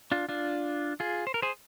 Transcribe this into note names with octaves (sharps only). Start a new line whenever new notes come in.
D4 F4
D4 F4
F4 G#4
C5
A#4
G#4 C5